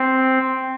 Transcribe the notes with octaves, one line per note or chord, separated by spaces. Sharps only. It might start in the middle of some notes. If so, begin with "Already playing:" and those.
Already playing: C4